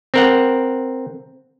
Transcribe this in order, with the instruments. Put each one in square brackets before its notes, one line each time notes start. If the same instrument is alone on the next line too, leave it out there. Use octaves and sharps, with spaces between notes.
[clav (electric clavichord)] C4 A#4 F#5